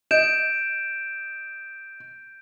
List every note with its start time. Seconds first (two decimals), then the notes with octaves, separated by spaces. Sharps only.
0.11 D#5 G6 D7 E7